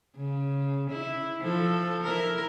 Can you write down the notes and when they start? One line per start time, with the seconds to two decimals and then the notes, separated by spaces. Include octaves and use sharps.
0.16 C#3
0.90 E4
1.41 F3 A4
2.03 E4 A#4